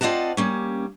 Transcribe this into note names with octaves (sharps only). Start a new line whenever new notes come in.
C4 F4 D5 D#5 F#5 A5
G3 A#3 C#4